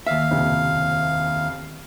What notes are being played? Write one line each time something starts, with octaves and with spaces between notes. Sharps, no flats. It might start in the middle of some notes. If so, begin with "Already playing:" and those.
D#2 E5 F5
F#1 C2 F2